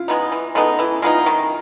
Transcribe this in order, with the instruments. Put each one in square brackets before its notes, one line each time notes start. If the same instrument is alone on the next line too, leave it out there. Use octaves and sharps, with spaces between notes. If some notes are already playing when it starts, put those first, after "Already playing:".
Already playing: [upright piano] E4 F4
[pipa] G#3 B3 D#4
E3
[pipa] G#3 B3 D#4 [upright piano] A4
[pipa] E3 [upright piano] E4
[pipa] G#3 B3 D#4 [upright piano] F4
[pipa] D#3